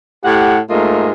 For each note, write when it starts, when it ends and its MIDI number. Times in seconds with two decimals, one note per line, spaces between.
0.25 0.59 45
0.25 0.59 67
0.25 0.59 78
0.70 1.12 44
0.70 1.12 57
0.70 1.12 58
0.70 1.12 65
0.70 1.12 75